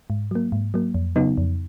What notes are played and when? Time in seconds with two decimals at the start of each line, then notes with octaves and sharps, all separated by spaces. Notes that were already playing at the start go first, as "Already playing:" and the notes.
0.10 G#2
0.31 F#3 A#3
0.52 G#2
0.74 F#3 A#3
0.95 F2
1.16 C#3 F#3 B3 D#4
1.38 F2